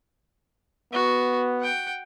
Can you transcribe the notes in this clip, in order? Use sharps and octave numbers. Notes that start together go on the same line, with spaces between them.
B3 F#4
F#5 G5